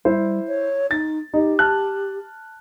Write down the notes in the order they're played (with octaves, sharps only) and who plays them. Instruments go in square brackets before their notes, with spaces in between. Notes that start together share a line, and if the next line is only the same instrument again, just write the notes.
[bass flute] G3 [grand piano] E4 C5
[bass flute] C#5
[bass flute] D#4 [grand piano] A6
[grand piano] D#4 [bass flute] G4
[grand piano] A5 F6 F#6